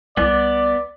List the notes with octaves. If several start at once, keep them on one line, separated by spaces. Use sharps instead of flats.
C2 B3 D5